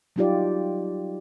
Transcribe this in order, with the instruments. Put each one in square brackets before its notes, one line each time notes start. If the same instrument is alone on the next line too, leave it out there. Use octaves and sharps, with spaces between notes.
[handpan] F#3 G3 D#4 F4 G4 D5